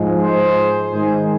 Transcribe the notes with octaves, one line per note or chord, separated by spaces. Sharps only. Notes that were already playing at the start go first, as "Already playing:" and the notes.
Already playing: G#2 F3 G#3
G#4 C5
G#2 D#3 G#3 G#4 C5